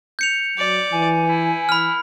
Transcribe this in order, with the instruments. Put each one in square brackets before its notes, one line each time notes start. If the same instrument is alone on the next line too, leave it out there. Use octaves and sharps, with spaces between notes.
[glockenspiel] G6 C#7 F7
[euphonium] F#3 [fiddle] D5
[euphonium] E3 [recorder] G#5
[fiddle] E4
[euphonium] E3 [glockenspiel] B5 F6